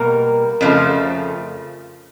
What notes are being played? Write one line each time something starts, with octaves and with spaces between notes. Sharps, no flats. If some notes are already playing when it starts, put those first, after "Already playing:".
Already playing: B2 G3 A#3 A#4
F2 C#3 F3 A3